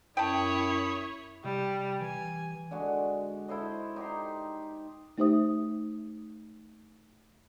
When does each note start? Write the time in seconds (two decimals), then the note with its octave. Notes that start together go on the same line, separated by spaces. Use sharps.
0.17 F#2 E4 C#5 G5 A5 B5 D#6
1.44 C3 G3
2.01 E3 G#5
2.71 D3 G#3 F#4
3.48 E4 A4 C5 D#5
3.96 D#4 G4 A#5 C6
5.18 A3 D#4 G4 C5 E5 D#6